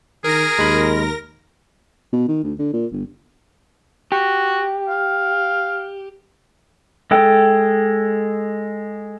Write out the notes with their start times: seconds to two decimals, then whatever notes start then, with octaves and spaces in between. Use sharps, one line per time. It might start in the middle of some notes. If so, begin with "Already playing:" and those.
0.24 D#3 G#4 A#4 A#6
0.59 D#2 G#3 B5
2.13 B2
2.28 D#3
2.44 D2
2.59 D3
2.74 A#2
2.92 G1
4.12 F#4 G4
4.88 F5
7.11 G#3 A4 G5